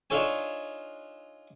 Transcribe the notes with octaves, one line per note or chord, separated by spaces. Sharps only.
D4 D#4 F4 A4 C#5 G#5